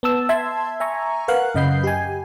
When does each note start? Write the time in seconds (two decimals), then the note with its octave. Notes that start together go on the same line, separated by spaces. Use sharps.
0.03 B3 A5 E6
0.29 E5 A5 C6 E6 G#6
0.80 E5 G#5 A#5 C#6
1.28 A#4 B4 F5 F#5 F#6
1.55 F#2 C#3 D#5 B5 G6 C7
1.84 G4 G#5